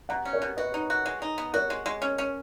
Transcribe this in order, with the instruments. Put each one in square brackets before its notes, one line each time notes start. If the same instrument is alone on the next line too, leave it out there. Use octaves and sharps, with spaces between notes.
[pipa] B2 [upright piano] F#5 A#5
[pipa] C#4
[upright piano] A#4 C#5
[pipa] B2
[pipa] F#4 [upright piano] B4 D#5
[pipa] D#4
F#4
G#3
D#4
B3
[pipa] F#4 [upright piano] A#4 C#5
[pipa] G#3
G#3
C#4
C#4